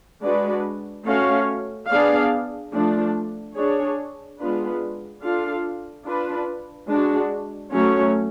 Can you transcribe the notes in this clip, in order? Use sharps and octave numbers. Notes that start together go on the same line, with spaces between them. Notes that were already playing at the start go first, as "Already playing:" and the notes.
G#3 D4 F#4 B4 D5
A3 C#4 F#4 C#5 F5
B3 D4 G#4 D5 F5
F3 A3 D4
D4 G#4 C#5
G#3 B3 D4 F4 B4
D4 F4 A4 F5
D4 F4 B4
G#3 D4 F#4
F#3 A3 C#4 F#4 C#5